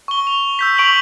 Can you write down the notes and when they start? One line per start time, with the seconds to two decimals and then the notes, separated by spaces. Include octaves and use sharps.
0.08 C#6 G7
0.27 F7
0.59 E6 G6 B6
0.78 C#6 D7 F7 F#7